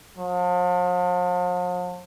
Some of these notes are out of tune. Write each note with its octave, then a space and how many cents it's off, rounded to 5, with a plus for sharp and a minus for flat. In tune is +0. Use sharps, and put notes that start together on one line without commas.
F3 +45